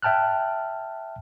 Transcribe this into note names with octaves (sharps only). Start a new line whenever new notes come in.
E5 G5 A5 F6 F#6